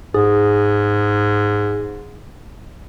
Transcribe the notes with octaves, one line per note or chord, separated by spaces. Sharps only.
G#2 G#4